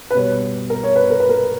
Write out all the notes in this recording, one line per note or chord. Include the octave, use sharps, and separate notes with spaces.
B4
B2 G3 B3 C#5
A#4
C#5
B4
A#4
B4
A#4